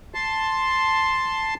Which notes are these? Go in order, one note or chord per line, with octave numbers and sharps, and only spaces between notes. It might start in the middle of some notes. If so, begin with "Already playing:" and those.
A5 C6